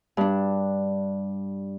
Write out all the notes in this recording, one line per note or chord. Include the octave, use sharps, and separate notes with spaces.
G2 D4